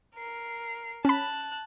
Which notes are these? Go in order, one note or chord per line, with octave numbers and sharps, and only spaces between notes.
A#4 C7
C#4 A5 B5 F#6